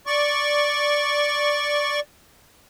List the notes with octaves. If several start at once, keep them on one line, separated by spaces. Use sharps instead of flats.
D5 C#6